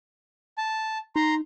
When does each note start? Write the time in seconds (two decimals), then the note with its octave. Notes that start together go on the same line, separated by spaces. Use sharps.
0.58 A5
1.16 D#4 A#5 C6